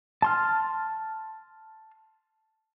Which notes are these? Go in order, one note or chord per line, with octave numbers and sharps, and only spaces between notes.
A5 C6 F6